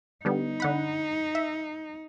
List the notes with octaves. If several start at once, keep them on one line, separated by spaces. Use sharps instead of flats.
D3 G3 B3 D#4
D3 F#5 B5
E5